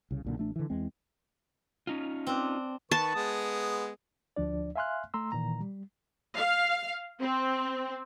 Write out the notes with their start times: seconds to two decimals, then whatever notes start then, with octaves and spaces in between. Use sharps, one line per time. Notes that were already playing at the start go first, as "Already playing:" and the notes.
0.11 C2 C#3
0.25 B1 A#2 D3
0.37 A1 A3 D4
0.56 D3 E3
0.70 E2 E3 G#3 C4
1.87 C#4 D#4 F4
2.27 C4 D4
2.92 D#3 B4 A5 C#6
3.15 G#3 B3 D#6
4.36 D2 F3 D4 D5
4.76 E5 F5 G#5 C6 F6 F#6
5.14 A3 A#5 C6 E6
5.32 A#2 D#3 E3 A#5
5.61 G3
6.37 F5
7.20 C4